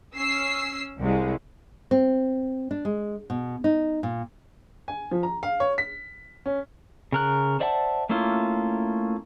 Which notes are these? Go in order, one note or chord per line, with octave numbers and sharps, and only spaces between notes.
C#4 E6 C7
C2 G#3
C4
D4
G#3
B2
D#4
A#2
G#5
F3
A#5
F5
C#5
B6
C#4
C#3 A#4 F#6
C5 D5 E5 F#5 A5
A3 A#3 C#4 E4 F4